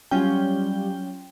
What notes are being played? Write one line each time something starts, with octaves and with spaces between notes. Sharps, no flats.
F#3 G3 C#4 F4 G5